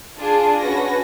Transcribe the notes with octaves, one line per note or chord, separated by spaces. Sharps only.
D4 F4 G#4 A5
C#4 F#4 B4 A#6